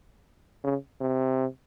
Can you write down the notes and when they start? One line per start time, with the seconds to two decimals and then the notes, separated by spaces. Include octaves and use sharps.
0.64 C#3
1.01 C3